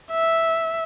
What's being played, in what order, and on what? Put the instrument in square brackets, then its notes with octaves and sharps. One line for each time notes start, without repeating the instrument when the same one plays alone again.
[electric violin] E5